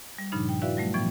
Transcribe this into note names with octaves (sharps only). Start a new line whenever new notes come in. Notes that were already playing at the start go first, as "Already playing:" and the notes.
G3
G2 A#2 C#3 F3 D4 D#4
G5
E4 F#4 B4 D5 E5 F5
F#3 G3 A3
A2 E3 F3 B3 G5